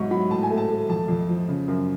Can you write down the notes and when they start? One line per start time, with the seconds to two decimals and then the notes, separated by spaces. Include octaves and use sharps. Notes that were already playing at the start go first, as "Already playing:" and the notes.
Already playing: G#2 F#3 B3 C#6
0.11 F#3 B5
0.30 A2 A5
0.43 G#5
0.50 A3
0.58 A5
0.69 A3
0.89 F2 A5
1.08 F2
1.29 F3
1.48 C#3
1.68 F#2